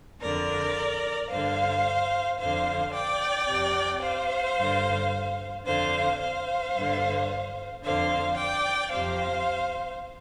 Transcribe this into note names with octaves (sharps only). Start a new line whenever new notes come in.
F2 D3 A#4 D5
G2 D3 C5 F5
F2 D3 C5 F5
D5 G5
F2 C3
C5 F5
G2 D3
F2 D3 C5 F5
C5 F5
G2 D3
F2 D3 C5 F5
D5 G5
F2 C3 C5 F5